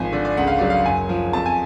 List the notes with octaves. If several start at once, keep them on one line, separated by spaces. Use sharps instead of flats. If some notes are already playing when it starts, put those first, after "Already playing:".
Already playing: G#1 F3 G#5
D3 D5
D5
C#2 F#5
F5
F#3 D5
F5
F#1 G#5
F3
F2 A5
G#5